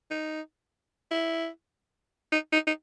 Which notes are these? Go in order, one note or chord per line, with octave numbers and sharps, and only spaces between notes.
D#4
E4
D#4
D#4
D#4